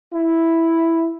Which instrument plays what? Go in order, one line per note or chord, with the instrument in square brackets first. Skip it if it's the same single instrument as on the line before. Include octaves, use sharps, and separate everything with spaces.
[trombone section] E4